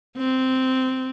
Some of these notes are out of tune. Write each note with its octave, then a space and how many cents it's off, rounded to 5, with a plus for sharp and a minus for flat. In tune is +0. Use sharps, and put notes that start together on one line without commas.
C4 -10